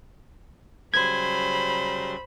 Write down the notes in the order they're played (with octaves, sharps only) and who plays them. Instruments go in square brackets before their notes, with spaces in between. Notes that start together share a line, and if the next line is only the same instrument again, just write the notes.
[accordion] C#3 F#3 G3 [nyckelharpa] C5 [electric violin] B5 [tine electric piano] G#6